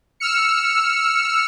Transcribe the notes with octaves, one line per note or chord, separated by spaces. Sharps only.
E6 F6 C#7